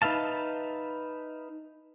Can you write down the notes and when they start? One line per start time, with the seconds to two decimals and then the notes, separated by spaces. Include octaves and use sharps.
0.02 D#4 B4 E5 F5 A5